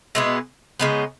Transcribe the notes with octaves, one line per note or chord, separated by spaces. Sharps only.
B2 G#3 B3 E4
C#3 G#3 B3 D#4